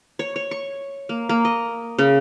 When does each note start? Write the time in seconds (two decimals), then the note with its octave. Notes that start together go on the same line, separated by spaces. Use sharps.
0.19 C#5
0.36 C#5
0.51 C#6
1.09 A#3
1.29 A#3
1.45 D#5
1.99 C#3